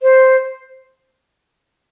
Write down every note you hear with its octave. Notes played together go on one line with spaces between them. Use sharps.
C5